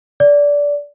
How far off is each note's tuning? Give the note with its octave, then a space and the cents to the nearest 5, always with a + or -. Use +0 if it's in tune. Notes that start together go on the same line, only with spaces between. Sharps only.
D5 -20